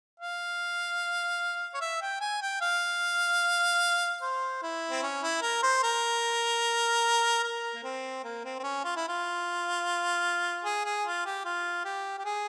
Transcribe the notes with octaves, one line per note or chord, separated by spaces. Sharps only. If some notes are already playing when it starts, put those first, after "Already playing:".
F5
C#5
E5
G5
G#5
G5
F5
C5
E4
C4
C#4
E4
A#4
C5
A#4
A#4
A#3
C4
A#3
C4
C4
C#4
F4
E4
F4
G#4
G#4
F4
G4
F4
G4
G4
G#4